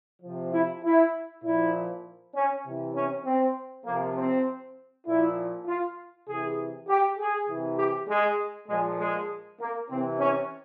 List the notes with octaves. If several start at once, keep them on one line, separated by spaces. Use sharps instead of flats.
C3 F3
E4
E4
A#2 F3 E4
C#4
C3 E3
C#4
C4
C3 F3 A#3
C4
A#2 F3 E4
F4
C3 E3 G#4
G4
G#4
C3 E3
G4
G#3
A#2 F3 G#3
G#3
A#3
C3 E3 C4
C#4